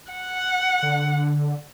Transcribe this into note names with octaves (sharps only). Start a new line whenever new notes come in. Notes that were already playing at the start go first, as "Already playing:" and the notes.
F#5
D3